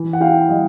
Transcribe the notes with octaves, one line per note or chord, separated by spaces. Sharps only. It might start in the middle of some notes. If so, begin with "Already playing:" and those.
Already playing: E3
F#5
E4 F5 G5
G3 D#5 F5